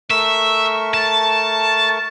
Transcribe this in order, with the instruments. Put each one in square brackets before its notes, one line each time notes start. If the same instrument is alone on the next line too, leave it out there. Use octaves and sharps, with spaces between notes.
[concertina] A3 A#4 C#6 [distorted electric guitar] E5
[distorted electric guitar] A5